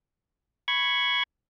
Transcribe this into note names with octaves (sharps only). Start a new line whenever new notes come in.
B5 C#6 G#6